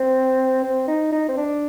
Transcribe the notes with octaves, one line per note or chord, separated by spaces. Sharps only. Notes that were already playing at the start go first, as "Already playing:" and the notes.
Already playing: C4
C4
D#4
D#4
C4
D4